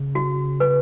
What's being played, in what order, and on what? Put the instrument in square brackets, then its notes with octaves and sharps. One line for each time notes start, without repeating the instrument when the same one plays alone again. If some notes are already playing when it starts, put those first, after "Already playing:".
Already playing: [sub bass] C#3
[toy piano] F#4
B4